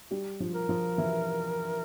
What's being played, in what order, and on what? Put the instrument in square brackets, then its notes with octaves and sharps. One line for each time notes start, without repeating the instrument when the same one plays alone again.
[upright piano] G3 G4
F3 F4
[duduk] A#4
[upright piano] F3 F4
E3 E4